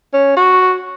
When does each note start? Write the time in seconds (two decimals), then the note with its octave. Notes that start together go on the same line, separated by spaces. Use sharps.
0.14 C#4
0.37 F#4